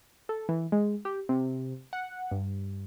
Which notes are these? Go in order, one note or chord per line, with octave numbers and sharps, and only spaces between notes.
A4
E3
G#3
G4
C3
F#5
G2